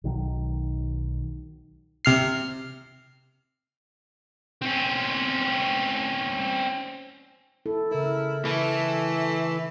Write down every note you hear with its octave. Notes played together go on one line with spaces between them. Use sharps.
B1 D#3 F#3
C3 F6 C7
C4 C#4
E4 A4
C#3 E4 A#4
E3 A3